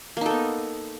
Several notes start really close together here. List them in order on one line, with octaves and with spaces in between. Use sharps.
A#3 D#4 A4 B3